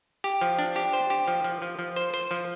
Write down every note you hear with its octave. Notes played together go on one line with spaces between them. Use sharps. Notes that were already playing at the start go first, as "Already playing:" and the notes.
G4
F3
D4
G4
C5
G4
F3
F3
F3
F3
C5
C5
F3